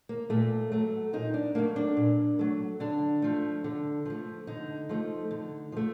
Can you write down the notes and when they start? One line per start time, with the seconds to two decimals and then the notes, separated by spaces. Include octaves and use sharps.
0.09 A#3
0.30 A#2 A3
0.72 F#3 A3
1.13 A#2 D#4
1.34 D4
1.55 F#3 A3 A#3
1.76 D4
1.97 A#2
2.39 F#3 A3
2.80 D3 D4
3.22 F3 A3
3.64 D3
4.05 F3 A3
4.47 D3 D#4
4.89 F3 A3
5.31 D3
5.72 F3 A3